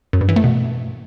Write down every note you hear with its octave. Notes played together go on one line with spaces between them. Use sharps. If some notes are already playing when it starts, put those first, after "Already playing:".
F#2
G2
E3
A3
B2